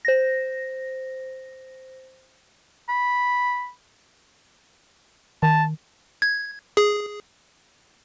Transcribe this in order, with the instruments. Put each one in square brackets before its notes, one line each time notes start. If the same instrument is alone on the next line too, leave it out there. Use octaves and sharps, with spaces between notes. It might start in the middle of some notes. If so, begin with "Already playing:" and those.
[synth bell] C5 A#6
[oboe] B5
[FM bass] D#3 [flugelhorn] A5
[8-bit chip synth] G#6
G#4